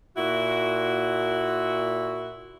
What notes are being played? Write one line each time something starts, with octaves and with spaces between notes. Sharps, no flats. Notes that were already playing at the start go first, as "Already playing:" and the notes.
A#2 E4 F#4